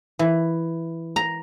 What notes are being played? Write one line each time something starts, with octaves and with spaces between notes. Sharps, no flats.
E3
A#5